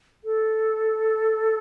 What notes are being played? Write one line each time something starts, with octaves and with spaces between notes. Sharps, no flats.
A4